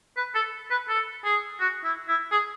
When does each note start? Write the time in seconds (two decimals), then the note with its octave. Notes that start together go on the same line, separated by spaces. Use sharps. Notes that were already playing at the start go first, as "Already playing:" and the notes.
0.17 B4
0.35 A4
0.71 B4
0.88 A4
1.25 G#4
1.60 F#4
1.84 E4
2.08 E4
2.32 G#4